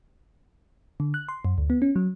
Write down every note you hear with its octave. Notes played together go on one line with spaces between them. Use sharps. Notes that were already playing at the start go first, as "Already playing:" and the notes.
D3
F#6
C6
F#2
D2
B3
C#4
F#3